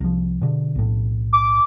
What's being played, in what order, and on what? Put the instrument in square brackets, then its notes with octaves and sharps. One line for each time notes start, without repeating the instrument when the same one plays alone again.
[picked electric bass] C2 F3
B2 D3
B1 A2
[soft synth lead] D6